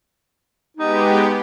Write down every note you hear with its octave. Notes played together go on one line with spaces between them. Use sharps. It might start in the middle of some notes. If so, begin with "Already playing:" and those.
G#3 B3 D#4 G4